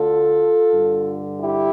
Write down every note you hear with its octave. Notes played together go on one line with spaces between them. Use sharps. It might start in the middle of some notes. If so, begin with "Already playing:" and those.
Already playing: D2 D3 F4 A4
G2 D3
E4 G4